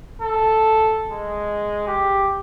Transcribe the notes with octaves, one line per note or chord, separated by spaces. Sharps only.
A4
G#3
G4